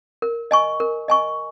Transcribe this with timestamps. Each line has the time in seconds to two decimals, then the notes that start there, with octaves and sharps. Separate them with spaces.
0.22 A#4
0.51 D#5 G#5 C#6
0.80 A#4
1.08 D#5 G#5 C#6